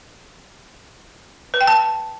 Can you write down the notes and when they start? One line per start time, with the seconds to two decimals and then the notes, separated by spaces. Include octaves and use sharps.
1.54 B4
1.61 G5
1.67 A5